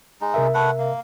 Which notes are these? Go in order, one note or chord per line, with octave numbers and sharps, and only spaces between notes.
G#3 D#4
C3 A#4 E5
A3 B4 F#5
A#3